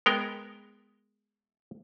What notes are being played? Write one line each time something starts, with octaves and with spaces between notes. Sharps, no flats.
G#3 B3 A#4 G5